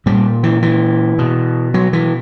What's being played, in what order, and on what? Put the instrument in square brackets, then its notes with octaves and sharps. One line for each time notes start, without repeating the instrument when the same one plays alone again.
[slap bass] A#2 G3
E3
E3
B2
F#3
E3